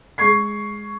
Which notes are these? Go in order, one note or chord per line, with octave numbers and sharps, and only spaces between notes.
G#3 C#6 G#6 C7